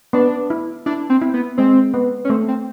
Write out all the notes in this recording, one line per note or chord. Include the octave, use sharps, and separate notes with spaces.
B3 D4
E4
D4 E4
C4
E4
B3
G#3 C4
B3
C#4
A3 C4
C4